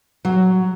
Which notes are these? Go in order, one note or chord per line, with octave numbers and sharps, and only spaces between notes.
F#3